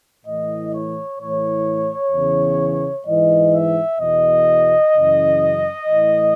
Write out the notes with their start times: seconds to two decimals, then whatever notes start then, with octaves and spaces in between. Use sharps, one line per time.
0.25 A2 E3 D#5
0.72 C#5
1.19 A2 E3 C#5
2.12 E2 C#3 E3
3.06 G#2 E3 D#5
3.53 E5
4.00 E2 B2 D#5
4.93 F#2 C#3 E3
5.87 A2 E3